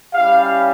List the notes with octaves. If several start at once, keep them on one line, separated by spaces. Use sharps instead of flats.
G3 C#4 E4 G4 F5